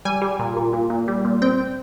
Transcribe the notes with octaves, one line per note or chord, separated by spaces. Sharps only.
G3 G#5
G3
A#2
A#2
A#2
A#2
G3
A#2
C4 G5